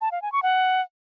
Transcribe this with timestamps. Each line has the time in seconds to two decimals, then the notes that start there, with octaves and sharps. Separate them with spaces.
0.01 A5
0.12 F5
0.22 G#5
0.32 C#6
0.43 F#5